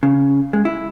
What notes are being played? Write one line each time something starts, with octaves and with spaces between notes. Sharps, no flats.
C#3
G#3
E4